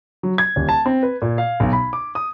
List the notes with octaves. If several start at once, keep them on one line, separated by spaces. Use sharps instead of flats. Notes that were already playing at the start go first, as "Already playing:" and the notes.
F#3
G#6
D#1
A5
C4
B4
A#2
F5
B1
B5
D6
D#6